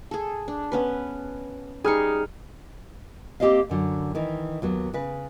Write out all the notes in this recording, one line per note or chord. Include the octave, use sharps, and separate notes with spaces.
G#4 A4
D4
B3 C#4 B4
G3 D#4 G#4 F6 C#7
A#3 C4 G4 C5 D#5 F5
F#2 D3 F#3
D#3 E3
D#2 F#3 B3
C#3 B4